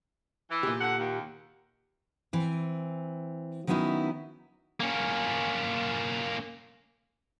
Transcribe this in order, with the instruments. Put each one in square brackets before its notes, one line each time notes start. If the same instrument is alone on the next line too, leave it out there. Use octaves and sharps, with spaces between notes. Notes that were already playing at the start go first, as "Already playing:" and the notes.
[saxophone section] E3
[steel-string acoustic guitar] A#2 G4
[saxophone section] D3 F#5
D#2
[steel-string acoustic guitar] E3 C4
D#3 F#3 B3 C#4 D#4 E4
[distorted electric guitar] A#3 C#4